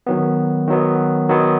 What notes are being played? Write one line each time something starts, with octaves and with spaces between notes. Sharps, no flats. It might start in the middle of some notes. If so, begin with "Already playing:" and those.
D#3 F#3 B3
D#3 F#3 B3
D#3 F#3 B3